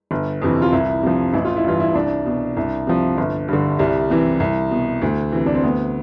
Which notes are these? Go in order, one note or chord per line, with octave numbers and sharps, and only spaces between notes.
G1
F2 C3 E3
F4
C2 E4
C3 F3
A1 E4
F4
E4
G2 E3 F4
E4
C2 D4
B2
C2
C3 F3
G1
G2 D3
C2 G3
C3 E3
C2
B2
D2
C3 E3
D4
C4
D2 B3